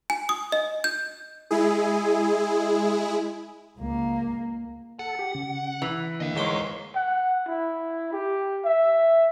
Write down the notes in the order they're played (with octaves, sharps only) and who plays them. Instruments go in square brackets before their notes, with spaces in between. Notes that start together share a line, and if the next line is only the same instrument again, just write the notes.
[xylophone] G#5
D#6
D#5
G6
[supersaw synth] G#3 E4 G#4
[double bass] C#2 A#3
[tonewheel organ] A4 [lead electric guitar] F#5
[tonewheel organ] G4
C#3
[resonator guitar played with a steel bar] E3
[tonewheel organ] D3 A#3 [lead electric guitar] D#5 F5
[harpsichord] G#2 G5 D6 [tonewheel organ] A#4 C#5 C6
[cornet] F#5
E4
G4
E5